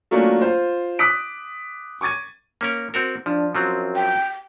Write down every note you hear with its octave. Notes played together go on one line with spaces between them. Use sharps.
F#3 A3 A#3 C#4 D4 F4
F4 C5
D6 D#6 F#6 B6 D7
C#6 D6 G#6 A6 D#7
A#3 C#4 A#4
C4 F#4 A#4
F3 D4
F#2 F3 F#3 C4
G5